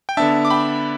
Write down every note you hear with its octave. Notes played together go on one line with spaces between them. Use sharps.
G5
D3 B3 D4 E5 A5
D6
G5 B5